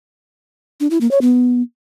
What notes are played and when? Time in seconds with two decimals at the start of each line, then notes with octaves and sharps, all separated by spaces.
0.80 D4
0.90 E4
1.01 A#3
1.11 C#5
1.21 B3